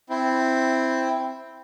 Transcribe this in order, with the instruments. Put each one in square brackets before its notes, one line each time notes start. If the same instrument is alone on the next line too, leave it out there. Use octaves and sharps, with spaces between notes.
[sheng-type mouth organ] C4 E4